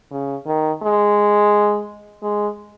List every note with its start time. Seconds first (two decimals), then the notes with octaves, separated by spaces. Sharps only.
0.11 C#3
0.47 D#3
0.82 G#3
2.22 G#3